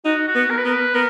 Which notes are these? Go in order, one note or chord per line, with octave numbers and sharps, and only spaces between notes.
D#4 F#4
F#4
B3
A#4
B4
B3 A#4
B4
B3 A#4